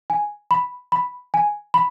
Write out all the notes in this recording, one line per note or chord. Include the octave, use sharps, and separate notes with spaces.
G#5
B5
B5
G#5
B5